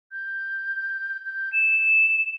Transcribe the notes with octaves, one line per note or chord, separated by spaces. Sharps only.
G6
G6
E7